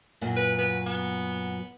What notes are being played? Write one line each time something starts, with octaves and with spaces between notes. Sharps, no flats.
F#2 A#2 F#3
B4
B4
B3